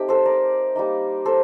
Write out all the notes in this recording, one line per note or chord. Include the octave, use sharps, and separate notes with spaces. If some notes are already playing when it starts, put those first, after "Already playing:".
Already playing: A3 C4 D#4 G4
A4 C5
A#4 D5
G3 A#3 D#4
A4 C5